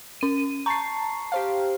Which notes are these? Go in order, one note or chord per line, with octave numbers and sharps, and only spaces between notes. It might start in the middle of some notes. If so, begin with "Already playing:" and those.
C#4 D#7
A5 A#5 C#6 C7
G4 C5 F5